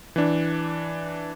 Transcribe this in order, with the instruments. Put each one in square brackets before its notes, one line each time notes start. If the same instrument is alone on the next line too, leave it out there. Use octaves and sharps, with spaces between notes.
[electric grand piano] E3 D4